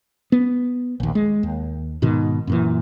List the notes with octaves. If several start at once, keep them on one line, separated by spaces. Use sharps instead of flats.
B3
A#1 D#2
G#3
D#2
G#2 B2 D#3
F#2 A#2 E3